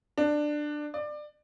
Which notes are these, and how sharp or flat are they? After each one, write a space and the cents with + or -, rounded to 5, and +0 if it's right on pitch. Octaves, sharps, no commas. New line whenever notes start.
D4 +15
D5 +25